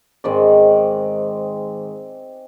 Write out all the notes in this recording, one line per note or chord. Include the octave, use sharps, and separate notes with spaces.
G#2 D#3 G#3 C4 D5